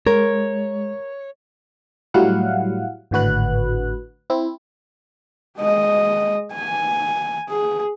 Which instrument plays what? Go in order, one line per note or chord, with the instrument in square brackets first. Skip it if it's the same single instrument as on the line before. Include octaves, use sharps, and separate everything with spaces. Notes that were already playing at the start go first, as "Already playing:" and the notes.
[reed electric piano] G#3 [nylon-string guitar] A#4 [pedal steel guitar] C#5
[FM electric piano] A2 F#3 G3 E4 F5 F#5
G#1 A2 D3 F#4 B4 F#6
C4 E4
[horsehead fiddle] G#3 D#5
G#5
G#4